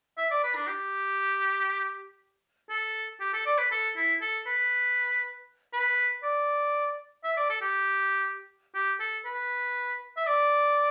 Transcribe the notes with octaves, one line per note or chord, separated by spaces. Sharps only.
E5
D5
B4
D4
G4
A4
G4
A4
D5
B4
A4
E4
A4
B4
B4
D5
E5
D5
A4
G4
G4
A4
B4
E5
D5